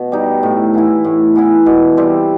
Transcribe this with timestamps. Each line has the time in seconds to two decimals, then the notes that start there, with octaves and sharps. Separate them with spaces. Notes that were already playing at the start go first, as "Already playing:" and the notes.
Already playing: B2
0.12 G3 D#4
0.43 A2
0.74 E3 B3 E4
1.04 A2
1.36 E3 B3 E4
1.66 B2
1.97 G3 C4